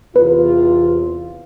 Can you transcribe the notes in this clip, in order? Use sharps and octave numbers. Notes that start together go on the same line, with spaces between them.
E2 C3 F4 B4